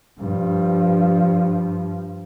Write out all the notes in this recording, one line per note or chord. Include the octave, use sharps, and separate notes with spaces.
G2 F3